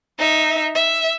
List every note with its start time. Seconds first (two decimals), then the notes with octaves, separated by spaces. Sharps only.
0.18 D#4 E5
0.75 E5